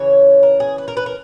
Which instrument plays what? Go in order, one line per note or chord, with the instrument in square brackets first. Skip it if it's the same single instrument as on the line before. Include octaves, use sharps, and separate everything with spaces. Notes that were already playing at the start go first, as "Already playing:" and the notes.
Already playing: [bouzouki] C#3 E3 C#4 C#5
A#4
G#4
B4
A#4
B4
A#4